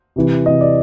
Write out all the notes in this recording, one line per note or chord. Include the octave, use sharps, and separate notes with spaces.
C3 E3
C3 E3 D#5
D5